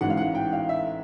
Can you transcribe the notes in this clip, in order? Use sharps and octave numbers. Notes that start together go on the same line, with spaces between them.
A1 G#2 E3 F#5
F5
F#5
G5
F5
E5